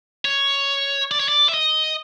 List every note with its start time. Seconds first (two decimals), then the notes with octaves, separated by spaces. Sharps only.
0.25 C#5
1.11 D5
1.20 C#5
1.28 D5
1.49 E5
1.54 D#5